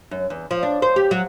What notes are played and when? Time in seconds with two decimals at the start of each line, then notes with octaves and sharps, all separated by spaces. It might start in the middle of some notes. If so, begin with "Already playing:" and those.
0.11 F#2
0.30 E2
0.51 F3
0.63 D4
0.82 C5
0.96 G4
1.11 F#3